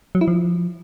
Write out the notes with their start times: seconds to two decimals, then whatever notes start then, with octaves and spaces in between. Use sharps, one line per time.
0.15 F#3
0.21 E4
0.28 F3